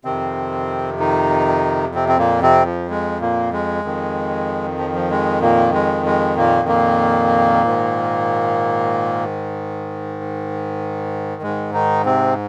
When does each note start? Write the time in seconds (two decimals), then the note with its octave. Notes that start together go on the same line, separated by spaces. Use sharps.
0.05 F2 C3 D#3 C4
0.99 D#3 D#4
1.95 C3 C4
2.09 C4
2.18 A#2 A#3
2.42 C3 C4
2.66 F3
2.90 G#3
3.21 A#2 A#3
3.53 G#3
3.84 F2 D#3
4.78 F3
4.95 F3
5.11 G#3
5.42 A#2 A#3
5.74 G#3
6.06 G#3
6.37 A#2 A#3
6.68 A#2 A#3
7.64 G#2 D#3
11.42 G#2 G#3
11.48 D#3
11.74 D#3 D#4
12.05 C3 C4